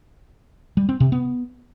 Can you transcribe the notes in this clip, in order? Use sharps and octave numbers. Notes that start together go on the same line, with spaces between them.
G3
C4
C3
B3